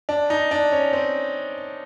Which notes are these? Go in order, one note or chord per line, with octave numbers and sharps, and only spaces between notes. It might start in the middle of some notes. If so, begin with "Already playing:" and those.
D4
D#4
D4
C#4
C4